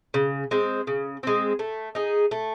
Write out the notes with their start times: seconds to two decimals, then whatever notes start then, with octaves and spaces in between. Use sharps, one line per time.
0.14 C#3
0.51 G#3 C4
0.87 C#3
1.23 G#3 C4
1.59 A3
1.95 D#4 G#4
2.31 A3